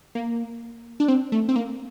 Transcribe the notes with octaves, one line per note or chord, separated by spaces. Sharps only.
A#3
D4
C4
A3
C4
A#3